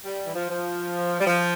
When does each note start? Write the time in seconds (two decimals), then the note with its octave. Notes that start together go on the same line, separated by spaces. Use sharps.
0.04 G3
0.27 E3
0.35 F3
0.50 F3
1.20 G3
1.27 F3